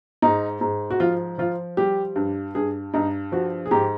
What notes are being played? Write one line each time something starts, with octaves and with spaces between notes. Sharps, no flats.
G#2 D#4
G#2
F#4
F3 F4
F3 F4
G3 G4
G2
G2 G#4
G2 D#4
F3 F#4
G#4
G#2 G4